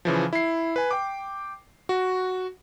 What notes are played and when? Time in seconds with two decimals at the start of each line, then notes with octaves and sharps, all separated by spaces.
0.05 C#3 E3 F3
0.33 E4 C7
0.76 B4 G#5
0.91 G5 D6
1.89 F#4